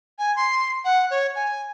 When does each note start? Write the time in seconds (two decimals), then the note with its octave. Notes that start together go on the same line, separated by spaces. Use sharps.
0.19 G#5
0.36 C6
0.85 F#5
1.11 C#5
1.35 G#5